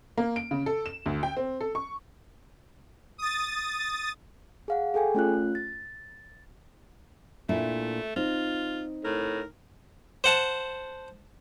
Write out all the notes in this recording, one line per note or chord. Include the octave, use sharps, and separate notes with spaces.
A#3
D7
C#3
A4
E7
D2
G5
C4
A4
C#6
D#6 A6
G#4 F5 F#5
G#4 A4 G5 G#5
A3 C#4 F4 F#6
A6
A#2 A3 D4 E4
C4 D#4 F4
A2 A#4
C5 F#5 A5